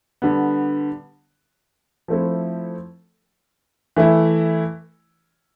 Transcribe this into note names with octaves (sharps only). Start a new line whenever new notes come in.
D3 G3 B3
F3 A3 C4 E4 A4
E3 A3 E4